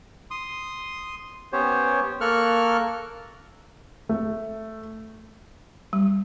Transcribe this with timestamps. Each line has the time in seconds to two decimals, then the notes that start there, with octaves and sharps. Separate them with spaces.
0.31 C6 D#6
1.53 B3 C#4 G4 C5 C#5
2.21 A#3 A4 A#4 C#6 F6 F#6
4.09 A3
5.93 G3